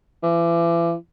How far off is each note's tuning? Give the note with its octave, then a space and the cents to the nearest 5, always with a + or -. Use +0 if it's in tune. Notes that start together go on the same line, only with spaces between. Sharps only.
E3 +40